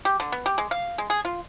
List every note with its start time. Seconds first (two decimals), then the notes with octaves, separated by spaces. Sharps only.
0.05 G4
0.20 D3
0.32 B3
0.46 G4
0.58 G#3
0.71 F5
0.98 G#3
1.10 G#4
1.25 F4